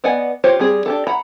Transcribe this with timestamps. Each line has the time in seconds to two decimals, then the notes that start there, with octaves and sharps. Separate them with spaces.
0.04 B3 D5 D#5 F#5 G#5
0.44 F4 G4 C5 C#5
0.59 G3 C4 G#4
0.86 D4 G4 A4
1.07 F#5 A#5 B5